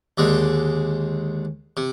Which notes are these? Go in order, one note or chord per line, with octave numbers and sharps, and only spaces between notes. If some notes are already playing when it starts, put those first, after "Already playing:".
D#2 D3 G#3
C3